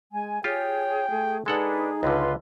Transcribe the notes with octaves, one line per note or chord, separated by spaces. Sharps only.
G#3 G#5
F4 G4 G#4 C#5 G5
A3
G#3 D4 D#4 G#4 A4 B4 F#5
C#2 D3 F4 B4 C6